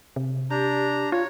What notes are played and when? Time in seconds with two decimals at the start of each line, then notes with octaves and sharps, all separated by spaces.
0.16 C3
0.51 D4 G4 A#5
1.12 F4 C#5